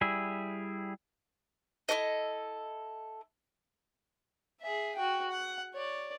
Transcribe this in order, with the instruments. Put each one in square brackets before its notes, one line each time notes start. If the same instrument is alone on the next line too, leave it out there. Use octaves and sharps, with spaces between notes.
[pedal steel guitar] G3 E4 G#4 E5
[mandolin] E4 F#4 A4 D#5
[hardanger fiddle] G#4 E5
F#4 G5
F#5
C#5 D5